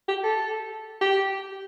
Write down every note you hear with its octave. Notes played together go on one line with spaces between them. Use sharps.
G4
A4
G4